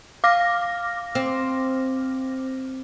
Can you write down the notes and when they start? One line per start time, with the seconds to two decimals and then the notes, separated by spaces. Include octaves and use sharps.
0.24 F5 D6 F6 A#6
1.15 C4